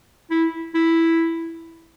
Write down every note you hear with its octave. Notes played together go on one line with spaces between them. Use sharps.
E4
E4